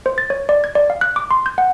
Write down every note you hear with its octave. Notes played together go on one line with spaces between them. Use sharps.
C5
A6
C#5
D5
G#6
D5
F5
F#6
D6
C6
G6
F#5